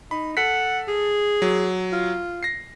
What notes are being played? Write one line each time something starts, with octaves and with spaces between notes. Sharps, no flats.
D#4 B5
A4 F#5 B6
G#4
F#3
F4
A#6 C7